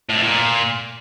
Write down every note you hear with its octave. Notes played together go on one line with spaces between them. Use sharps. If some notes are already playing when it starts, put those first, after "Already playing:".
A2
F2
A#2